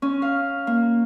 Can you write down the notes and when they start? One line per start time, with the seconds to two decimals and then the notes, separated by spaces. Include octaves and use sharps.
0.02 C#4
0.22 F5
0.67 A#3